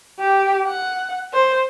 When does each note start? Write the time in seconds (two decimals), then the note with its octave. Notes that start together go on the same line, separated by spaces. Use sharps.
0.19 G4
0.66 F#5
1.34 C5